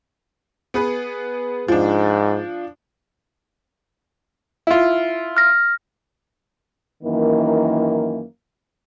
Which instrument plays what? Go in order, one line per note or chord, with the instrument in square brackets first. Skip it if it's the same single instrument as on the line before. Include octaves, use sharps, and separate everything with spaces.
[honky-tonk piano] B3 G#4 B4
[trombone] G#2 [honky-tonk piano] F3 D4
[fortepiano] E4 F4
[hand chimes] F6 A#6
[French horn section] F#2 D#3 E3 A#3